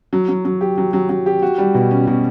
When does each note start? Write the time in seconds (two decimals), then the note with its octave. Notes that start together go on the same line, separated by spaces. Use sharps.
0.13 F#3
0.28 F#3
0.45 F#3
0.61 G4
0.78 F#3
0.93 F#3
1.09 F#3
1.26 G4
1.42 F#4
1.58 G3
1.74 B2
1.91 C#4
2.07 B2